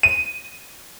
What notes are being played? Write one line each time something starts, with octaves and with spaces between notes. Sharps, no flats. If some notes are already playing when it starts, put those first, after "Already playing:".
D#7